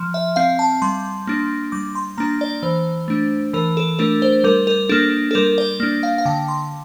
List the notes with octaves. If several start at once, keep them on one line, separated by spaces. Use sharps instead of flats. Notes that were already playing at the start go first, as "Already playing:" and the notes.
Already playing: F3
E5
C4 F5
A5
G3 C6
A#3 D4
G3 D6
C6
A#3 D4 A#5
D5
E3 C5
A3 D4
E3 A#4
A4
A3 D4 A#4
C5
G3 A#4
A#4
A#3 D4 A4
A4
G3 A#4
D5
A#3 D4
F5
F5
D3 G5
C6